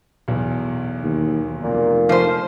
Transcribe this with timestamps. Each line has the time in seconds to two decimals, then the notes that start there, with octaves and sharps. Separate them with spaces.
0.28 B1 E2
1.02 D#2
1.63 F1 A#2
2.09 F3 C5